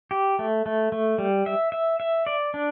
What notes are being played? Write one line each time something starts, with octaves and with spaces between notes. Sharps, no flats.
G4
A3
A3
A3
G3
E5
E5
E5
D5
D4